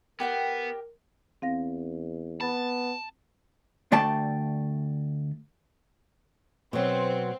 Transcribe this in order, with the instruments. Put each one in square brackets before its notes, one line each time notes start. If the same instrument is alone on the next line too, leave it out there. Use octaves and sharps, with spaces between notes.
[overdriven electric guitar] B3 [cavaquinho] G4 F#5 G5 [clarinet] A#4
[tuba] E2 [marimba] C4 F5 A#6
[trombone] B3 [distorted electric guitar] A5 [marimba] B5 A6
[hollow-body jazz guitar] D2 A3 D5 G5 A5
[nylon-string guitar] B2 F#3 [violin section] C4